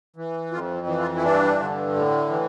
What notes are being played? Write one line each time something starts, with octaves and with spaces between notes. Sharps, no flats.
E3
F2 F4
E3
F4
E4
G2 D4
D3
A2
E3